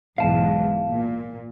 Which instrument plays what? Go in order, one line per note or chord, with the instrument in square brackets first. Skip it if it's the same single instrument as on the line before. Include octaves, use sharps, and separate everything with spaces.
[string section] B1 E2 G#2 [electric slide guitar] F5 A5
[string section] A#2